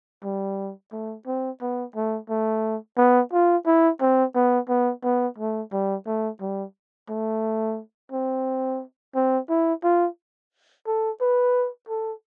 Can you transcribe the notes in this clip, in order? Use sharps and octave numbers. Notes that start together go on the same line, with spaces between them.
G3
A3
C4
B3
A3
A3
B3
F4
E4
C4
B3
B3
B3
A3
G3
A3
G3
A3
C4
C4
E4
F4
A4
B4
A4